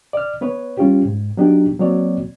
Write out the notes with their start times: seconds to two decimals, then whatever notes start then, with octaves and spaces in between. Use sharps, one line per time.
0.13 D5 F6
0.41 B3 B4 C#5
0.77 G3 C#4 F4 G4
1.05 G#2
1.37 F#3 B3 D4 D#4 G4
1.79 F#3 A#3 C4 F#4 C#5 D5